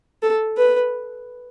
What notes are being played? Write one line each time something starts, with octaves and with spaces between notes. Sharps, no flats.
A4
B4